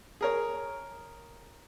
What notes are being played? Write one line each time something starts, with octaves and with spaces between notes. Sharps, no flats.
G#4 A#4 C#5